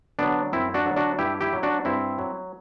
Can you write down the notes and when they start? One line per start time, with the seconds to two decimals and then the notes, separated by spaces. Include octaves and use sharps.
0.19 D3 F#3 B3 D4
0.52 F#2 C4 E4
0.74 D4 F#4
0.86 D3 F#3
0.96 D4 F#4
1.19 G2 E4 G4
1.41 E4 G4
1.53 F#3
1.63 D4 F#4
1.85 G2 C4 E4
2.19 F#3